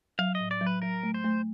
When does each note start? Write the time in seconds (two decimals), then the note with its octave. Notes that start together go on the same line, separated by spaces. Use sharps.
0.19 F#3 F5
0.35 D#5
0.40 A2
0.51 D5
0.61 F#3
0.66 B4
0.82 F#3 A#4
1.03 A3
1.14 C5
1.24 A3